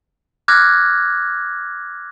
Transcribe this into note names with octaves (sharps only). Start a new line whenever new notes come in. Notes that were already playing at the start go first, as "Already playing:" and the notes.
D6 F6 F#6 G#6 A#6